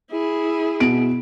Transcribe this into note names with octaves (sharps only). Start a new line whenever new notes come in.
E4 G#4
B2 D7